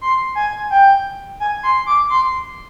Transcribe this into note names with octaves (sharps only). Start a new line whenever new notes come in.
C6
G#5
G5
G#5
C6
D6
C6